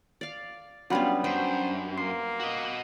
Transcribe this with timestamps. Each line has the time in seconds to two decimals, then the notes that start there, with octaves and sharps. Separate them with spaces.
0.21 D5 F5
0.90 F#3 G3 B3 C#4 D4 F4 B5
1.24 F#2 C5 G5
1.98 A#3 C6 C7
2.40 F#4 D#5